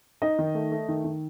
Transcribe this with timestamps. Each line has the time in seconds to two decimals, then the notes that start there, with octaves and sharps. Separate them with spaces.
0.22 D#4 D#5
0.39 D#3
0.54 A3
0.72 A3
0.89 D#3
1.04 D#3